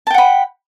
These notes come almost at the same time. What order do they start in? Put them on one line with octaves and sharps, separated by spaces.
A5 G5 F#5 B5